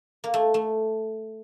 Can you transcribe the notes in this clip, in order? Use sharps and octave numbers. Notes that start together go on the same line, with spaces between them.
A#3
A3
A3